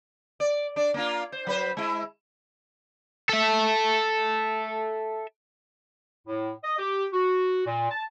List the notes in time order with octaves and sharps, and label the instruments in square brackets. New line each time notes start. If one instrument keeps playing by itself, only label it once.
[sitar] D5
D4 D5
A#3 D4 F4
C5
F#3 B4 C5
G#3 E4
[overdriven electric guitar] A4 E5
[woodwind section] A2
D#5
G4
F#4
A#2
A5